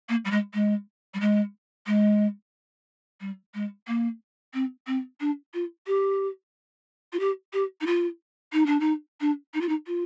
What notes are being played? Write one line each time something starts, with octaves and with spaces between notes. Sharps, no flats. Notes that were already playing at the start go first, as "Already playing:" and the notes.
A#3
G3
G#3
G#3
G3
G#3
G#3
G3
G#3
A#3
C4
C4
D4
F4
G4
F4
G4
G4
D#4
F4
D#4
D4
D#4
D4
D#4
F4
D#4
F4